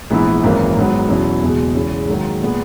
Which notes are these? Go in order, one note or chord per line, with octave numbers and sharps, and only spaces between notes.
A#1 G#2 E3 B3 E4
G#1 F#2 E3 A#3
G#1 G#2 F#3 B3
E2 B2 F#3 C#4 E4
F#1 E2 B2 G#3
E2 C#3 G#3 C#4 E4
G#2 D#3 F#3 A#3
A#2 G#3 B3